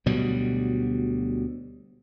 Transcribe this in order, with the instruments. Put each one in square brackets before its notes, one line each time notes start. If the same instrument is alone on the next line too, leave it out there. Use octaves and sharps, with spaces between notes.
[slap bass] D2 B2 F#3 G3